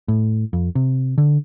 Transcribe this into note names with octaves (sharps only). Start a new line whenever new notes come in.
A2
F2
C3
D3